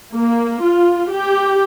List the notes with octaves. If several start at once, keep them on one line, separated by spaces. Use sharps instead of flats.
A#3
F4
G4